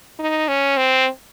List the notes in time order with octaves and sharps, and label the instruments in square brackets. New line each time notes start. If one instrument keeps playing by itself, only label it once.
[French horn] D#4
C#4
C4